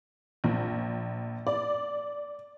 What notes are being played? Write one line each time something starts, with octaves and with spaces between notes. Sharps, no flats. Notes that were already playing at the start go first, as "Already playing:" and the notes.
A#1
D5